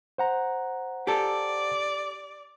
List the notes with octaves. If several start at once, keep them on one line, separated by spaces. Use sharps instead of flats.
C5 F#5 A#5
G4 A4 D5